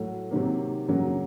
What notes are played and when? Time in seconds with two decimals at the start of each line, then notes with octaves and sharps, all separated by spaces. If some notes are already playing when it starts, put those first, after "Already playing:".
Already playing: A2 F#3 A3
0.31 C3 D#3 F#3 A#3
0.88 F#2 C#3 F#3 A#3